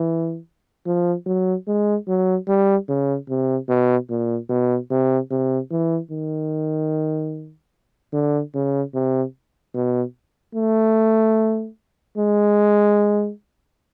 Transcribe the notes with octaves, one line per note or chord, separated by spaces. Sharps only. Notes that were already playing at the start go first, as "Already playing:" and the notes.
Already playing: E3
F3
F#3
G#3
F#3
G3
C#3
C3
B2
A#2
B2
C3
C3
E3
D#3
D3
C#3
C3
B2
A3
G#3